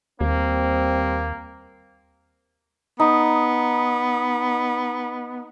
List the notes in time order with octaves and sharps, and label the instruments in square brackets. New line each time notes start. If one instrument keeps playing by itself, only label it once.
[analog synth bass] D#2 [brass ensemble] G3 C4 [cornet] A#3
[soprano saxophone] B3 [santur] D#4